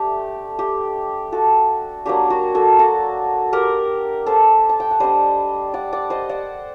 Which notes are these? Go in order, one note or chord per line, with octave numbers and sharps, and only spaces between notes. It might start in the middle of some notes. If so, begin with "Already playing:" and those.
Already playing: A3 D4 G4
G4
F#4 A4
F#3 A#3 D4 G4
F#4
F#4 A4
F#4 A4
G4 A#4
A4 C5
A5
G5
F#5
G3 D4 C5 D#5
D5 F#5
D5 F#5
C5 D#5
D5 F#5